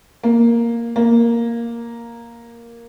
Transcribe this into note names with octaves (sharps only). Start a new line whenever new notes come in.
A#3
A#3